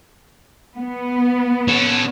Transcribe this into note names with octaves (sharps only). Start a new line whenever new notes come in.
B3
C#4 A4